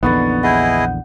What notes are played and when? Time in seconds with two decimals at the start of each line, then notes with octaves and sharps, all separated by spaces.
0.03 A#1 E2 D3 B3 D#4 C#6 A6
0.43 E4 G#4 D#5 F#5 G6